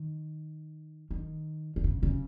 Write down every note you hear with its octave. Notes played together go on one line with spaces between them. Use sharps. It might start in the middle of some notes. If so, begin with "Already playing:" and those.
Already playing: D#3
D#3
D#3
C#3
C#3